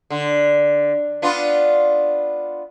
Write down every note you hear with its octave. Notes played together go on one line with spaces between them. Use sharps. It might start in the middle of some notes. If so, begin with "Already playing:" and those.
D3
B3 D4 F4